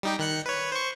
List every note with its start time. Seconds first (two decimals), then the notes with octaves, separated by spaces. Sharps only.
0.03 G3 D#4 G4
0.19 D#3 F#6 C#7
0.46 B4 C#5
0.72 C5 C#6